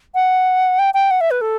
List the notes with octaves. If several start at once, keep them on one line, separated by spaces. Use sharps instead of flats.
F#5
G5
G5
F#5
E5
B4
A4